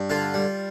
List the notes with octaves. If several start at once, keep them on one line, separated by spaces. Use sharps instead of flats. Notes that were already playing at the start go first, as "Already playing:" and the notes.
Already playing: G2
D3 F4
G3